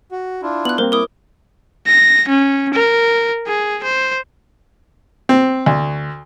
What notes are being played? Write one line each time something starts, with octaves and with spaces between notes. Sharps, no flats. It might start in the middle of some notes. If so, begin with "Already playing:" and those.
F#4
D4 E4 F4
B3 F#6 F#7
G3 A#3 C4 A#4 C5
E4 A#4 D6 D#6
A#6
C#4
A#4
G#4
C5
C4
D2